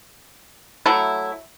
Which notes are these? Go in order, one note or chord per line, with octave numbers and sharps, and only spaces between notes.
F#3 A3 E4